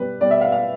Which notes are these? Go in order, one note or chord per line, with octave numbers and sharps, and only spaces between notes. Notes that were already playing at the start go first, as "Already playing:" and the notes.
Already playing: B2 G3 B4
B2 G3 D5
E5
F5
F5